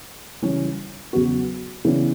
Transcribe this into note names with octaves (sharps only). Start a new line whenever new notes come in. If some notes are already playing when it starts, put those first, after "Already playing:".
C#3 E3 G3 C#4
E2 C#3 F#3 B3 F#4
C#3 E3 B3 D4